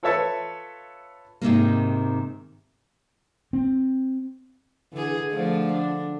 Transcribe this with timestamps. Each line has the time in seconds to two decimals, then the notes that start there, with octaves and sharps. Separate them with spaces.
0.03 F4 A4 B4 C#5 E5 A5
1.41 G#2 C3 D#3 A#3
3.53 C4
4.93 D3 E3 G#4
5.31 D3 F3 A3
5.72 D4